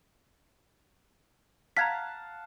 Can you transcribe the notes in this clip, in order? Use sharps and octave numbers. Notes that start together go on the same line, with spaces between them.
F5 F#5 A5 A#5 G#6 B6